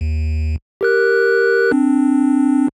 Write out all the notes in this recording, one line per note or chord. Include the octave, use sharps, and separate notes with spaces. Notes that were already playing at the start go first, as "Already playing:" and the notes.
D#2
G4 A#4 F#6
C4 D4